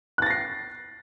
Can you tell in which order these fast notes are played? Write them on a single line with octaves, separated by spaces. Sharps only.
F#6 A6 A#6 C7